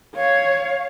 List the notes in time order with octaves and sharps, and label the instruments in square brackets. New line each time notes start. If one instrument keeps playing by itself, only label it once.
[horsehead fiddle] C#5 [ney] F5